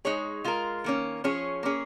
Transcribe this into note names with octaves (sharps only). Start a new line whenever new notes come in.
G#3 D#4 G#4 C#5
G#3 F4 A#4
D#3 A#3 C#4
F3 C#4 G#4 C#5
A#3 C#4 G#4